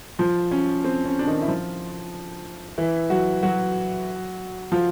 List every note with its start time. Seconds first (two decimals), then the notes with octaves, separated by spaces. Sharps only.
0.19 F3 F4
0.51 C#4
0.84 C4
1.05 C#4
1.19 D4
1.27 D#3 D#4
1.42 E4
1.48 F3 F4
2.78 E3 E4
3.10 F#3 F#4
3.43 F#3 F#4
4.72 F3 F4